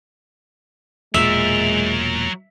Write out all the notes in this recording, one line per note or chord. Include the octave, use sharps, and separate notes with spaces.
E1 A#2 F#3 G#3 A#4 E5